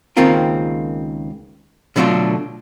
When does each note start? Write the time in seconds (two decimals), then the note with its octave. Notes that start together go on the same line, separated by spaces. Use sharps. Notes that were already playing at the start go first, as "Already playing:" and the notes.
0.17 C#2 D#3 A#3 C4 F4 A#4
1.96 B2 D3 F#3 A3 D4 F4